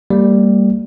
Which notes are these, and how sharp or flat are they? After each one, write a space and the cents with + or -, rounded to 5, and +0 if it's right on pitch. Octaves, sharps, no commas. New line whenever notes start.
G3 +0 A#3 -35